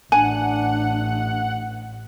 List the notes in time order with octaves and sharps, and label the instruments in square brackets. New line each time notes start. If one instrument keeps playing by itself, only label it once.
[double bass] A1 [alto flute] D4 [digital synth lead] F#5 [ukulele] G#5